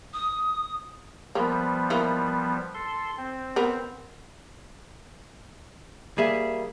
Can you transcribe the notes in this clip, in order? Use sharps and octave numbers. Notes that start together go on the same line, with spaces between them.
D#6
F3 G3 A#3 B3
E3 A#3 D#4
A4 C6
C4
B3 A#4
G3 A#3 G#4 E5